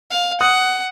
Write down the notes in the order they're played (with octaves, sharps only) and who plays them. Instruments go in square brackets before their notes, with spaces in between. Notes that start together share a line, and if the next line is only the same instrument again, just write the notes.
[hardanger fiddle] F5
[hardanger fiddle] F#5 [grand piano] D#6 F#6